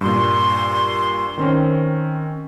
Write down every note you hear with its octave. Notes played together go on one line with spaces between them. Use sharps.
G2 A#2 C6
D#3 C4 C#4